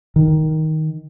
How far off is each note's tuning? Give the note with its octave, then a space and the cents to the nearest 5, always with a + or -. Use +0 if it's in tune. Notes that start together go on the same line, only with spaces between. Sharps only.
D#3 +10